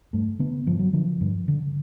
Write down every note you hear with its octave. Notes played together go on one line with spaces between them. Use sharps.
G2 A3
D3 B3
G2 F3
F#3
D3 F3
G2
D3